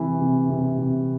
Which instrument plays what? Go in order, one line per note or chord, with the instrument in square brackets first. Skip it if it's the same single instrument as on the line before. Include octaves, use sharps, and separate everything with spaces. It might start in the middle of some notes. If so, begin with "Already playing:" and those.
Already playing: [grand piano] C3 E3
C3
C3
C3